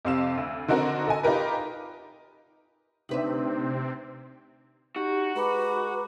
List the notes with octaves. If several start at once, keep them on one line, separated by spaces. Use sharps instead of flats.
F2 C3 C4 F5 E6 E7
D2
D3 C4 D#4 F#4 A#4
A4 D#5 G#5
D#4 F4 G4 A#4 B4
D2 C3 C4 D4 D#4 B4 E5
D#4 F#4 G4
G#3 B4 A#5 B5 D6